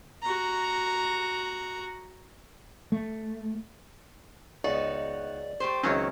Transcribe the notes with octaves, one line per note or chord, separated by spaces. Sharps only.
F#4 A#5
A3
C#2 B3 D#4 F#4 D5
A3 G4 C5
C#2 D#3 F#3 C4 C#4 E4 C#5